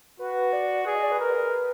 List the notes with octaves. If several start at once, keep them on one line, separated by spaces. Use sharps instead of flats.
F#4 B4
D5
G#4 D5
D#5
D5
B4
A#4